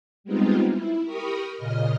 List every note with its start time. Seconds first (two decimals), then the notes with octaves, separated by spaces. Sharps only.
0.24 G3 G#3 B3 C4 D#4 F4
0.70 E4
1.04 G4 A#4 B5 C#6 D#6
1.56 A#2 C#3 D#5 F6